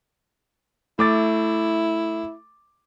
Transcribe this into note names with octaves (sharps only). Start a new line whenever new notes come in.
A3 E4 D6 A6